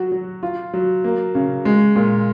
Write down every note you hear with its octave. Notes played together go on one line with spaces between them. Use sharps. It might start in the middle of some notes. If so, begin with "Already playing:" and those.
Already playing: F#3 F#4
F#3
F4
F#3
A#3
C#3
G#3
A#2